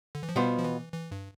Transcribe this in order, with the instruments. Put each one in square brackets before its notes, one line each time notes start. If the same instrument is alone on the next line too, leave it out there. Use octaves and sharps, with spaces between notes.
[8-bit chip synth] D3
E3
F3
[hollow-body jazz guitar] B2 B3 F4 C5 [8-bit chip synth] G3
[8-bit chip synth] F3
E3
E3
G2